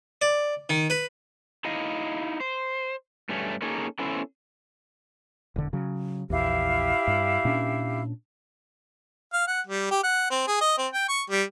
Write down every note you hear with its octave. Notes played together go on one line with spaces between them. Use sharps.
D5
D#3
B4
D#4 E4 D#5 F5
C5
G2 A3 C#4
A#3 C#4 D#4 G#4 A4
B3 C#4 E4 A4 C5
E1 D3
C#3 F#3
A#1 E2 E4 G4 F5
G2
A#2 C#4 D4
F5
F#5
G3
G4
F#5
C4
G#4
D#5
C4
G5
C#6
G3